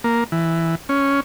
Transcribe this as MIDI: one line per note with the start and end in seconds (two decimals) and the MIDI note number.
0.04 0.24 58
0.32 0.75 52
0.89 1.20 61